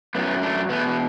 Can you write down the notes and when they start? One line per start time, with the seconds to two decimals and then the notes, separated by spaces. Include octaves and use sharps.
0.15 F#2 F#3 A3 B3
0.42 A3 D4
0.69 E2 B2 A3 B3
0.87 B3